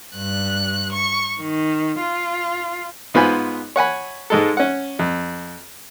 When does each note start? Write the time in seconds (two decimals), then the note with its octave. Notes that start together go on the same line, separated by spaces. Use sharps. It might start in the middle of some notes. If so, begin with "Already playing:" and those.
0.16 G2 F#6
0.92 C#6
1.40 D#3
2.01 F4
3.14 G#2 B3 F4 C5 G#5 B5
3.76 C#5 F#5 G#5 B5
4.30 G#2 G#3 A4
4.57 C#4 F#5
4.99 F2